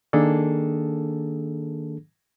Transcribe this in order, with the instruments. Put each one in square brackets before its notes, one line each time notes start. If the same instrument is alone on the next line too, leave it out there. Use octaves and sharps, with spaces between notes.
[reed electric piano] D#3 A#3 D4 G#4 A4